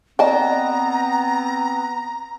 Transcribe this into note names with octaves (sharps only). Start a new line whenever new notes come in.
B3 C4 D5 D#5 G5 A5 A#5 C6